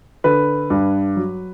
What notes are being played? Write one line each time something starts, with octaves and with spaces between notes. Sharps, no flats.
D3 B4
G2
F#3